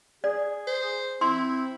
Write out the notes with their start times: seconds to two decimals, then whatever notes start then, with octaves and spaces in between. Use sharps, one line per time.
0.24 G#4 D5
0.67 C5
1.21 C4 E4 C6